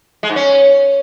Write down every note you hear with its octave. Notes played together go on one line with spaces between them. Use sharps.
G#3
G#2
C#4